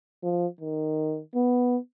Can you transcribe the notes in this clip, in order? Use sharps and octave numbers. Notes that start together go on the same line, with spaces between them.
F3
D#3
B3